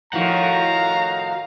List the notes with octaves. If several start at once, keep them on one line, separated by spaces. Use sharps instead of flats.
A2 D#3 F3 F#4 F5 F#5 A#5